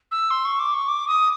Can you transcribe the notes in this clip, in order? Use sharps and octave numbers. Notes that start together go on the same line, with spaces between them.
E6
C6
C#6
D6
C#6
D6
D#6